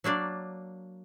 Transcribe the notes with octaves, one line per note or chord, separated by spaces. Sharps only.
F#3 A#3 D4 D5